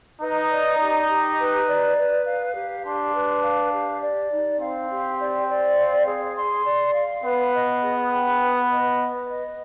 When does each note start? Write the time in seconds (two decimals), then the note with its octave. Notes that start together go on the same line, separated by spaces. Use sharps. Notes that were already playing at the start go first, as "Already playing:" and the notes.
0.21 D#4 B4
0.50 D5
0.80 G4
1.09 G4
1.38 B4
1.68 D5
1.97 B4
2.26 F5
2.55 G4
2.84 D4 C6
3.14 B4
3.43 F5
3.73 G4
4.02 D5
4.31 D#4
4.60 C4 F5
4.90 G4
5.19 D5
5.48 D5
5.78 F5
6.06 G#4
6.36 C6
6.65 D5
6.94 F5
7.23 B3 B4
7.53 D#5
7.82 G#4
8.11 G5
8.41 B4
8.70 D#5
8.99 B4
9.28 D#5